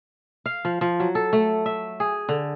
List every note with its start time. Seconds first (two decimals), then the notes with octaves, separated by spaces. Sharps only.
0.46 F5
0.65 F3
0.81 F3
1.00 F#3
1.15 A4
1.33 A3
1.66 E5
2.00 G#4
2.29 D3